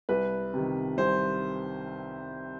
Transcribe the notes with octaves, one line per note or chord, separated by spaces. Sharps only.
C2 B4
C3 D#3
C2 C5